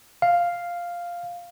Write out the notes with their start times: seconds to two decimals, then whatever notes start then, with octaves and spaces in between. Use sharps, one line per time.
0.22 F5